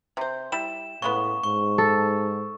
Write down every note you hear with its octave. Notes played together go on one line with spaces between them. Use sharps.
C3 C5
G3 E4 E7
A2 C#3 G#3 B3 C#6
G#2 C#6
A4